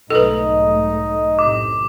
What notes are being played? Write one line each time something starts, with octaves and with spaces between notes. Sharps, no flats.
B1 G#2 A3 D#4 A4 B4 D#5
F#2 A2 C3 D6